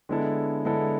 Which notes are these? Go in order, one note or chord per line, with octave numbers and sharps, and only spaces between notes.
D3 G#3 B3 E4 A4
D3 G#3 B3 E4 A4